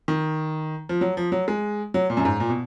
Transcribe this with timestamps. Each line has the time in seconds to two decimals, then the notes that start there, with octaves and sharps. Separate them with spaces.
0.08 D#3
0.89 F3
1.01 F#3
1.17 F3
1.32 F#3
1.48 G#3
1.94 F#3
2.10 A#2
2.17 F#2
2.25 G#2
2.40 A#2
2.50 B2